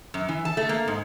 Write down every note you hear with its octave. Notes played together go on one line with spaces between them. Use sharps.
F#2
E3
A5
A3
A#3
G#2